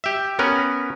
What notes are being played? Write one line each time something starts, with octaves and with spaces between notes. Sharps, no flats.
G4 E5
B3 C#4 A#4 B4